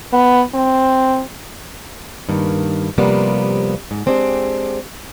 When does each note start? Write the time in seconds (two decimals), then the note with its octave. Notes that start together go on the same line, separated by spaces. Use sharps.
0.12 B3
0.54 C4
2.29 G2 D#3 A#3
2.98 C3 F3 G3 A#3 B3
3.91 G#2
4.06 G#3 C4 D4 G4 G#4